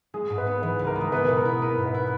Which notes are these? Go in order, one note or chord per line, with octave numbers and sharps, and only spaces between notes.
G#3 G#4
G#2
B4
B3
E3 B4
C#2
A#4
G#3
A#4
B3 B4
B2 B4
A#4
E4
B3 A#4
G#2
B4
E4